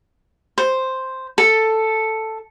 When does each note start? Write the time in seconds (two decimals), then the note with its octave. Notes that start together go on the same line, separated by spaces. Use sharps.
0.58 C5
1.38 A4